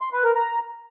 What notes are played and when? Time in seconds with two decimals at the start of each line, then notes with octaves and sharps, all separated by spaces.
0.01 C6
0.13 B4
0.24 A#4
0.36 A#5